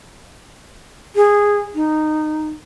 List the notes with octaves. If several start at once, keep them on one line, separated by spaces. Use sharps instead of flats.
G#4
D#4